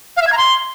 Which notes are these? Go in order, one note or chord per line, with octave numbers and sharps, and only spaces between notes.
F5
E5
G#6
A#5
C6